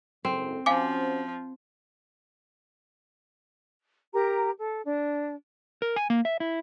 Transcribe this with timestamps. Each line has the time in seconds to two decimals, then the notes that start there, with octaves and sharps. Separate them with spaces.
0.25 F#1 G#2 C4 A4
0.66 F3 C#4 F#4 C5 F5 G#5 D6
4.15 G4 A#4 A#5
4.58 A4
4.84 D4
5.82 A#4
5.96 G#5
6.10 A#3
6.25 E5
6.40 E4